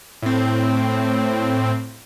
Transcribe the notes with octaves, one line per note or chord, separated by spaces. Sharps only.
A2 C4